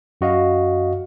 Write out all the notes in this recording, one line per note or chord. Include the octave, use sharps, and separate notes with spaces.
F#2 F#4 D#5 F5